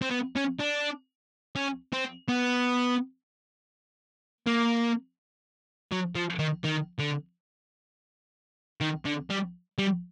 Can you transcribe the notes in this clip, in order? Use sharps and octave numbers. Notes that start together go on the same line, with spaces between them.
C4
B3
C#4
D4
C#4
C4
B3
A#3
F#3
F3
D#3
D#3
D3
D#3
D3
G3
G3